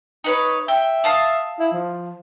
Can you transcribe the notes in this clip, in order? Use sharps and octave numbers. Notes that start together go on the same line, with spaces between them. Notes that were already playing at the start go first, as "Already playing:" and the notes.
D#4 B4 C#5
E5 G5
F5 A5 D#6
E4
F3